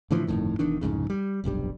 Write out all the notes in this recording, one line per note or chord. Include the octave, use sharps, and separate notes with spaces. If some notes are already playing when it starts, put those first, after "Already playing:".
A2 D3 E3 F3
G1 F2 A2 D#3
E1 E2 D#3 D4
C2 F2 G#2 C#3
G3
F1 B1 G2 G3